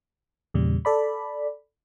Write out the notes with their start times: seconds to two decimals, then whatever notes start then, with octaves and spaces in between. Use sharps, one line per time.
0.54 E2 A#2 C#3 G3
0.85 A4 D5 B5